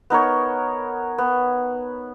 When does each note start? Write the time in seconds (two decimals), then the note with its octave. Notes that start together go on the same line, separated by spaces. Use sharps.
0.10 B3 D#4 A#4 C#5
1.18 B3